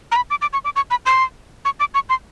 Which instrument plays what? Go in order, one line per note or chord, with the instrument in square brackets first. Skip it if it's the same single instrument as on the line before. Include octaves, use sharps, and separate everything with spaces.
[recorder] A#5
B5
D6
D6
C#6
D6
C#6
B5
C6
C#6
D6
C#6
C6